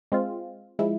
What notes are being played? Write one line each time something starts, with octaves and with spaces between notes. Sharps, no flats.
G#3 C4 F4
F3 G#3 E4